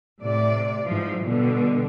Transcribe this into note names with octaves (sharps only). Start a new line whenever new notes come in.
A2 C3 D5
G#2 E3 F3
B2 D3 G3